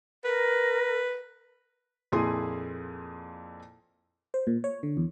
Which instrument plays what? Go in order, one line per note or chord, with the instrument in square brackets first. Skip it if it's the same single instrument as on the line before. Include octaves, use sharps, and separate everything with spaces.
[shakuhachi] A#4 [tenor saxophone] B4
[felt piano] F2 A#2 E4 G#4 C6 D#6
[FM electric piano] C5
A#2
C#5
D3
E2